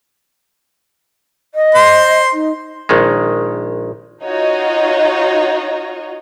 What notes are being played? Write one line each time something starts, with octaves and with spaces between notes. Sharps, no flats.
D#5
C5 C6
D#4
A#1 D#3 G#3
D#4 F4 F#4 C#5 D#5